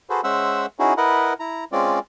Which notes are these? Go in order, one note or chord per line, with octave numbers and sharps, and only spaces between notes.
F#4 G#4 A4 B4 C5
G#3 C#4 C5 E5 F#5 E6
C#4 D#4 E4 F#4 G#4
E4 A#4 B4 D#5 F#5
E4 A#5
G#3 C4 C#4 F4 D5